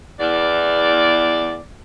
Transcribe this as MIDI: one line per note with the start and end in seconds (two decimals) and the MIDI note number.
0.19 1.60 40
0.19 1.60 74